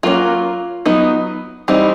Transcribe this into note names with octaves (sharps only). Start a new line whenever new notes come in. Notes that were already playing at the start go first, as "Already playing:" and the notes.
F#3 A#3 C#4 F4
F#3 B3 D#4
E3 G3 C4 D#4